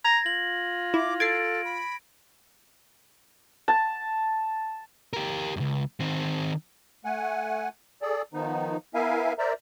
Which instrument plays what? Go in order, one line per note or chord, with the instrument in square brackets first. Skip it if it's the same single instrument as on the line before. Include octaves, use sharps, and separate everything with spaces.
[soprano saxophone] A#5 [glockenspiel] G#6 A#6
[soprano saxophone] F4 [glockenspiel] F#7
[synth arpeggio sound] E4 [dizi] D6
[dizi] A4 [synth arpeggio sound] G#6 A6 C7 [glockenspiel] D7
[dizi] B5
[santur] A5
[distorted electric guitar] G4 A#4
C#2 F#2
D#3 C4
[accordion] A3 F#5 G#5
G#4 A4 D5
D#3 F3 B3 D#4
B3 E4 A#4 E5 F5 G#5
A#4 C5 D5 E5 A#5